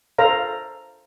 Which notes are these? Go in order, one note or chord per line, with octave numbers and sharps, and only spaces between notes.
A4 C5 F5 A#5